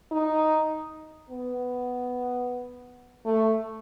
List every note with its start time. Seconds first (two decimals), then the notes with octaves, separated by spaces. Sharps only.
0.12 D#4
1.30 B3
3.26 A3